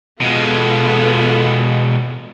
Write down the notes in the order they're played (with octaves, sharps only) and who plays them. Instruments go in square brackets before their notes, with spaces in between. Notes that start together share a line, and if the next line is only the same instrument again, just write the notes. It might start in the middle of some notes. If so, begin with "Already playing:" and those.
[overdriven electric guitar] B2 G#3 [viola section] B3 F4 A4